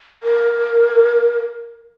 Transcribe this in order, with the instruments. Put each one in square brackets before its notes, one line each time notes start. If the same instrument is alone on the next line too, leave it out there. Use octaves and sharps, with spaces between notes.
[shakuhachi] A#4